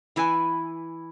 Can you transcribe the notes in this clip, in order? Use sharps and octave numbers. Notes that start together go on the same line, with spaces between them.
E3 E4 B4 G#5